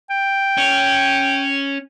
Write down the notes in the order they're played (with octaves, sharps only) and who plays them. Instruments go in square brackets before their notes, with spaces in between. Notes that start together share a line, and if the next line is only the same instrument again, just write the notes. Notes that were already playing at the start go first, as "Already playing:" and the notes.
[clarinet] G5
[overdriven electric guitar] C#4